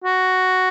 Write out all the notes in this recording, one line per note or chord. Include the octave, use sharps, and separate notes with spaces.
F#4